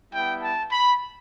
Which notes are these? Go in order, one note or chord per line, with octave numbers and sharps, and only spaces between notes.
G3 B3 E4 G5
A5
B5